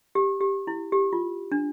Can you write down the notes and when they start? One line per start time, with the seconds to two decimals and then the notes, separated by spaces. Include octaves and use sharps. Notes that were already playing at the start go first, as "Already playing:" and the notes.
0.15 G4
0.41 G4
0.67 E4
0.92 G4
1.13 F4
1.52 D4